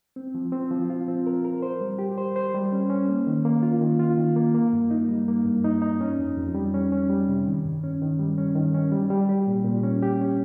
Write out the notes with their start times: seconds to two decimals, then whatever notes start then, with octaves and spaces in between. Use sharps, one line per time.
0.16 C4
0.35 F3
0.52 C4
0.71 F3
0.90 F4
1.08 C4
1.26 A#4
1.45 A#4
1.62 C5
1.80 G3
1.98 G4
2.18 C5
2.36 C5
2.54 G3
2.72 C#4
2.90 C#4
3.09 A#3
3.27 D#3
3.45 A#3
3.63 F4
3.81 D#3
3.99 F4
4.17 D#3
4.36 A#3
4.55 A#3
4.73 G2
4.91 D#4
5.09 G3
5.28 A#3
5.45 G2
5.65 D#4
5.82 D#4
6.01 C#4
6.19 F2
6.37 F2
6.55 G3
6.74 C#4
6.92 C#4
7.10 G3
7.28 C3
7.46 D#3
7.65 G2
7.84 C#4
8.02 D#3
8.19 G3
8.38 C#4
8.55 D#3
8.74 C#4
8.92 G3
9.10 G3
9.29 G4
9.47 A#2
9.65 A#2
9.83 C#4
10.03 G4
10.21 C#4